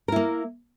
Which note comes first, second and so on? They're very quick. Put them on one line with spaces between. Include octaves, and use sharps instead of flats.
A#4 E4 A#3